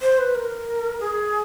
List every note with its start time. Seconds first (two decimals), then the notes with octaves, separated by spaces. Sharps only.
0.01 C5
0.18 B4
0.35 A#4
1.00 G#4